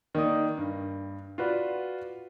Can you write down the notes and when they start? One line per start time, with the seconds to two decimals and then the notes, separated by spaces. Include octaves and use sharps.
0.15 D#3 A#3 D5 D#6
0.57 G2
1.38 F4 F#4 B4 D5